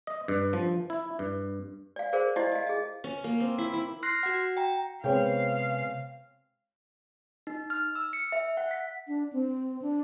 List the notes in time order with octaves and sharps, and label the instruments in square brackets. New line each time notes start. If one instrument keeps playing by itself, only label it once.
[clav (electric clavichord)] D#5
G2
F3
E4
G2
[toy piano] D5 F5
G#4 A#4 C5 D5 F5
E4 G4 C5 D5 D#5 F5
D#5 F5
G#4 D#5
[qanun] C#4
A#3
C4
E4
E4
[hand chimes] C6 F6 F#6 A#6 C7
F#4 F#5
G5 A#5
[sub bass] C3 [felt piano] G#3 B3 C4 [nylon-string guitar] C#5 G5 [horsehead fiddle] F5
[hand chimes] D#4
F6
E6
C#7
E5
F#5
B6
[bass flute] D4
C4
D4